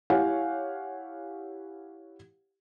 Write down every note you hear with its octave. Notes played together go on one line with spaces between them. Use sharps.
E4 G4 C#5 F5 F#5 G#5